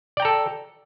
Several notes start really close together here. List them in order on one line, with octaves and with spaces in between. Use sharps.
D5 G5 A#5 A4